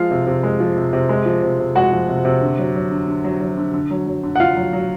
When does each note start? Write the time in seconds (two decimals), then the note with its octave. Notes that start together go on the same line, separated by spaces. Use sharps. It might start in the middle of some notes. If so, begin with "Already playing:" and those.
Already playing: F3 G#3 F4 F5
0.11 C3
0.27 C3
0.43 G#3
0.60 F3
0.77 C3
0.93 C3
1.09 G#3
1.26 F3
1.42 C3
1.59 C3
1.75 G#3 F#4 F#5
1.92 F3
2.09 C3
2.25 C3
2.42 D3
2.58 F#3
2.75 F#3
2.91 D3
3.08 D3
3.24 F#3
3.41 F#3
3.57 D3
3.74 D3
3.90 F#3
4.07 F#3
4.23 D3
4.36 F#5
4.40 D3 F4 F5
4.57 F#3
4.73 F#3